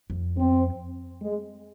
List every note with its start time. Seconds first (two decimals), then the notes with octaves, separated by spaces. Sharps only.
0.10 F2
0.38 C4
1.22 G#3